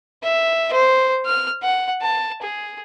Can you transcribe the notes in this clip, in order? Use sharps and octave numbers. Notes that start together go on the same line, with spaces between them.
E5
C5
F6
F#5
A5
G#4